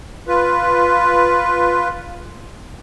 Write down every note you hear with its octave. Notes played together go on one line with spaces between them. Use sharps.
F4 B4